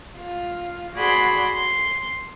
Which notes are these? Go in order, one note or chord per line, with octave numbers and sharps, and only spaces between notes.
F4
F#4 G#4 D5 B5 C6
C6